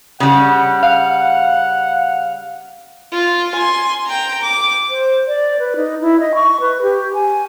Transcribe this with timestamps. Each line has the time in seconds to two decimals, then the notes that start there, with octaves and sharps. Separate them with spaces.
0.20 C#3 G3 F#5
0.83 F5 F#5
3.12 F4
3.55 G#5 C6
4.07 G5 A#5
4.43 D6
4.90 C5
5.28 D5
5.59 B4
5.76 D#4
6.02 E4
6.20 D#5
6.35 C#6
6.61 B4
6.82 G4
7.14 G#5